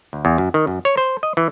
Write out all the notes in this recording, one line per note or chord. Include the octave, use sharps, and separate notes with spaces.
D2
E2
F#2
D#3
F#2
C#5
C5
D#5
E3